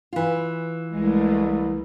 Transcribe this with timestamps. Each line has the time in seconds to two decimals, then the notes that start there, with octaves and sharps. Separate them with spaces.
0.13 E3 F4
0.93 C2 G#3 A3